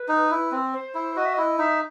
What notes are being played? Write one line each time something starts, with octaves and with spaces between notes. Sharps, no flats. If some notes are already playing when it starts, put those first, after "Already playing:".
Already playing: B4
D#4
E4
C4
C5
E4
F#4 D#5
E5
E4 D#5
D#4 E5